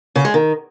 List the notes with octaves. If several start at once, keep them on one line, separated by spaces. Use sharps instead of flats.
C#3
G#3
D#3